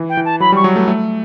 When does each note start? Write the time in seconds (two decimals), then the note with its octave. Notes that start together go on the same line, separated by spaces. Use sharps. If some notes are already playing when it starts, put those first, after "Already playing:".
Already playing: E3
0.09 G5
0.17 E3
0.25 A5
0.40 F#3 B5
0.52 G3 C#6
0.64 F#3
0.76 A3
0.88 A3